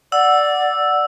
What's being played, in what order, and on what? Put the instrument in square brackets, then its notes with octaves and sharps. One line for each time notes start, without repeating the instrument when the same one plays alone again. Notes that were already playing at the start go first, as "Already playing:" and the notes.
[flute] D5 [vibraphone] F#5 [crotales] E6